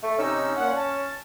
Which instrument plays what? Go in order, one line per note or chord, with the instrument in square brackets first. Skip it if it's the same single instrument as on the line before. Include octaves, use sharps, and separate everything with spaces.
[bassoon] A3
[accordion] C3 D#4 E6 [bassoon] C#4
[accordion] A#2 F#5
A5